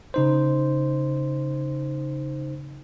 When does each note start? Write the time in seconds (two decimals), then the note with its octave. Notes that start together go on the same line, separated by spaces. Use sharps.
0.14 C#3 D#4 C5